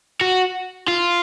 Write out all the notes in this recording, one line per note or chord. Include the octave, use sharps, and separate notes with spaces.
F#4
F4